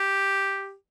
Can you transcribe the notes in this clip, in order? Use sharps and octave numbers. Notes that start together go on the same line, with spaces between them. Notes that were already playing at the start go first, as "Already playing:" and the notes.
Already playing: G4